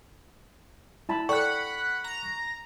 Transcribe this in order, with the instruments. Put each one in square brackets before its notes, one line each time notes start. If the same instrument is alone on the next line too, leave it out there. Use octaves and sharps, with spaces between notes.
[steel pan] E4 A5 B5
[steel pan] A4 D5 G5 [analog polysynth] F#5 B5 [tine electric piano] C#6 F#6
[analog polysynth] A#5